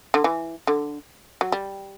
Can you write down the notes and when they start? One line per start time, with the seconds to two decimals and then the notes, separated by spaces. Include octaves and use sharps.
0.14 D3
0.24 E3
0.67 D3
1.41 F#3
1.52 G3